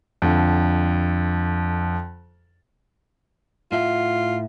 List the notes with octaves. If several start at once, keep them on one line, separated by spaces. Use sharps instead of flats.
F2 D3
A2 F4 E5 F#5